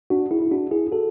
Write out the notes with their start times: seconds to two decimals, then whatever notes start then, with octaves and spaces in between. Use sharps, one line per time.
0.10 D4 F#4
0.31 E4 G#4
0.42 E4
0.51 D4 F#4
0.71 E4 G#4
0.92 F#4 A4